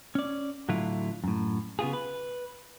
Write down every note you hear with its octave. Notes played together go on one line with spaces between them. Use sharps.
C#4 D5
A2 D3 F#3 E4 F4
F#2 A2
C#3 B3 F4 G#4
B4